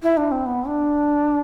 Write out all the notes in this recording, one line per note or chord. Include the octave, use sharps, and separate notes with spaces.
E4
D4
C4
B3
D4